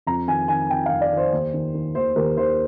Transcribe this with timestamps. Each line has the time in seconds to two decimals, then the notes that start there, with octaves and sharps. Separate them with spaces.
0.06 F2 A#5
0.28 D#3 G#5
0.48 D#3 G#5
0.70 F2 G5
0.86 F5
0.91 F2
1.01 D5
1.12 D#3 C5
1.33 D#2
1.54 D#3
1.74 D#3
1.95 D#2 C5
2.16 D#2 A#4
2.37 D#3 C5